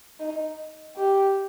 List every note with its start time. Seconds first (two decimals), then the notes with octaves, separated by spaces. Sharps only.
0.20 D#4
0.96 G4